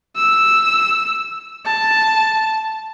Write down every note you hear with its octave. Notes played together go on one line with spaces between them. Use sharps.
E6
A5